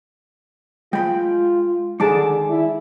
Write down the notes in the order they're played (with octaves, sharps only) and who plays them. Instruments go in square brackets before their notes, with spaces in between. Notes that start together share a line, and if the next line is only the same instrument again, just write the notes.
[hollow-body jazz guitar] G#3 B5 [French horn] F4 [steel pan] G5
[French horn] D3 [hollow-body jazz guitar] D#3 G#3 D#4 [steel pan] G#4 A5 D6
[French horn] E4